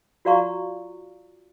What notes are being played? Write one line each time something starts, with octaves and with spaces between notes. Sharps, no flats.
F4 F#4 D5 F5 A#5 C#6